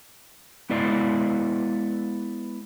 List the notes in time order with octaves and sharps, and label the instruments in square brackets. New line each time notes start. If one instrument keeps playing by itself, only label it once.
[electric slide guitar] G#3 B3 E4 B4 D5 F5